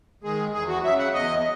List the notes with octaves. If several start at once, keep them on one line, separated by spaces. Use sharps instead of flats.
D#3 G#3 G#4
E2 G#4
F#4
C#3 F#3 E5
F#5
E2 D#5